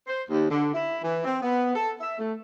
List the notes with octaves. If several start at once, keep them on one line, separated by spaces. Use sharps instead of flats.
C5
D#2
D3
E4
E3
C4
B3
A4
E5
A3